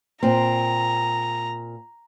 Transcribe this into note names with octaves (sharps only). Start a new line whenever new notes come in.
A#2 C4 A#5